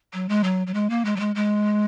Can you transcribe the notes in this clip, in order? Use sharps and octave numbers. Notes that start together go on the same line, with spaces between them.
F#3
G#3
F#3
F#3
G#3
A#3
G#3
F#3
G#3
G#3